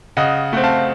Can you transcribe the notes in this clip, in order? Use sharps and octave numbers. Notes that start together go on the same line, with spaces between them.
C#3 D#5 F#5
A3 C4 F#5
F5 A5